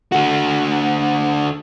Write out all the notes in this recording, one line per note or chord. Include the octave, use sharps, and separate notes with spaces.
D3 F#4